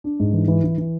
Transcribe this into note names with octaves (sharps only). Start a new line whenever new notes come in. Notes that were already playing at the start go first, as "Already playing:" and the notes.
D4
G#2
E3
E3
E3
E3